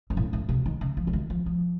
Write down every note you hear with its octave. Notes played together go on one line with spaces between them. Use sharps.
F#2
A2
A2
C3
D#3
C#3
F3
C#3
D#3
F3
F3